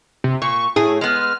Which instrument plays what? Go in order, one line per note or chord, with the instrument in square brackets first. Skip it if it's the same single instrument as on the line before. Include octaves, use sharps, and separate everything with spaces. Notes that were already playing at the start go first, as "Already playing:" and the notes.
[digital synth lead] C3
[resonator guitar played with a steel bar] A#2 [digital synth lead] C#6
[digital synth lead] A2 [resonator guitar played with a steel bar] G#4
[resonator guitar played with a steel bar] G#3 B3 [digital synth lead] F6